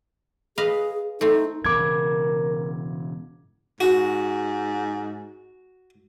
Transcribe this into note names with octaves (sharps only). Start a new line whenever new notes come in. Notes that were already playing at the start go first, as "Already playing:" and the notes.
G#4 B4 D#5 F5
A3 C4 D#4
E1 C#3 A#4 D6 G#6
G#2 F#4